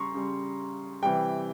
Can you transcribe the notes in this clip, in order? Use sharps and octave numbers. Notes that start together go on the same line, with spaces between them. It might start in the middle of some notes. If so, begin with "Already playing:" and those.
Already playing: C#3 G3 A#5 C6 C#6
C#3 G3
C3 E3 G3 G5